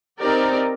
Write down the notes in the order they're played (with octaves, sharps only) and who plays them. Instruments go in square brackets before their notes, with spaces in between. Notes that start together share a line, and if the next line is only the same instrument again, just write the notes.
[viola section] C4 D#4 G4 A#4 D5